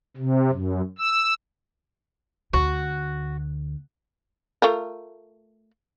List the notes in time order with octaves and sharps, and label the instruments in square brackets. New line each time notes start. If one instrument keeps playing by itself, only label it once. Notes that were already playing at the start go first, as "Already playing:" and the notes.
[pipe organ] C3
F#2
E6
[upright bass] D2 [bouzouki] F#4
[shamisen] A3 F4 A#4